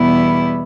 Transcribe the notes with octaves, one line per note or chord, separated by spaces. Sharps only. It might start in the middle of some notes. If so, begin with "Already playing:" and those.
Already playing: E2 B2 G3 B3 E4